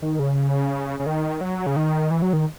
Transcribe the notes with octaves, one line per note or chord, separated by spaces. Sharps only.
D#3
C#3
C#3
D#3
F#3
C#3
D#3
E3
F#3
D#3